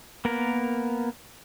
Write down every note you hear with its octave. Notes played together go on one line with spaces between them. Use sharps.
A#3 B3 A#4